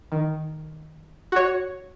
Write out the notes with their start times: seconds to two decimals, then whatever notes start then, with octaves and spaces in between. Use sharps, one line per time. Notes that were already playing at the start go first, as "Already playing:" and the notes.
0.12 D#3
1.32 F#4 C#5